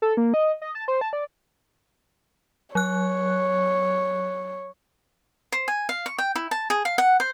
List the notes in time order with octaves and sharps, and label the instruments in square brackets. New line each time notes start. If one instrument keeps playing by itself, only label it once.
[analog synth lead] A4
A#3
D#5
D#5
A5
C5
A5
D5
[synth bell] F#3 F#6 [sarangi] C#5
[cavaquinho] C5
G#5
F5
C#6
G5
E4
A5
G#4
F5
F#5
C5